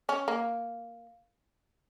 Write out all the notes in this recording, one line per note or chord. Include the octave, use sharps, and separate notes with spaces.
C#4
A#3